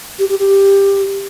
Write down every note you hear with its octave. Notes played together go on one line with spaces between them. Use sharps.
G4
G4
G4